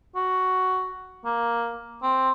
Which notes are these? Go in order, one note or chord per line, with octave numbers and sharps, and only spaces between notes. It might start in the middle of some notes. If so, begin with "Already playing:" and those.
F#4
A#3
C4